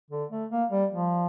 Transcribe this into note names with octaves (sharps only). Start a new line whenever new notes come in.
D3
A3
A#3
G3
F3